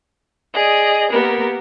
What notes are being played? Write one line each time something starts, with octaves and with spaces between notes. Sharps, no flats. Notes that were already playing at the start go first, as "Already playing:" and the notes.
G#4 D5 D#5
A#3 B3 G4 A#4